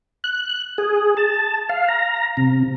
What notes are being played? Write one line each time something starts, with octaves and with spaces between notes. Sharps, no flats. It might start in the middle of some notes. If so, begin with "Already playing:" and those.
F#6
G#4
A5
F5
A#5
C3